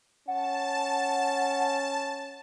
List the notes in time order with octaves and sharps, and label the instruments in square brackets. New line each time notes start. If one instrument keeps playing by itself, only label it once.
[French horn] C#4 [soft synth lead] F#5 [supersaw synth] A5